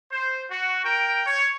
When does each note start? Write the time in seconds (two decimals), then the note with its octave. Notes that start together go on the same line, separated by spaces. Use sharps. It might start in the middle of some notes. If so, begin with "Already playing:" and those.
0.11 C5
0.50 F#4
0.84 A#4 G5
1.25 C#5